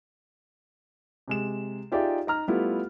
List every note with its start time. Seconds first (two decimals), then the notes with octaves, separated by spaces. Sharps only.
1.28 C3 G#3 E7
1.92 D#4 F4 G4 G#4 D5 E5
2.27 D#4 A#5 F6
2.48 G3 A3 B3 E4 F4